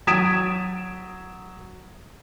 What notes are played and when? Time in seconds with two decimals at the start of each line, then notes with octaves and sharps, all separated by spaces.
0.07 F#3 D#6 G#6 B6 D7 E7